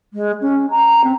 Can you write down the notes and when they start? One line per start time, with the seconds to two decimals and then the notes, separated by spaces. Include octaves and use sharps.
0.13 G#3
0.41 C#4
0.70 A#5
1.04 C4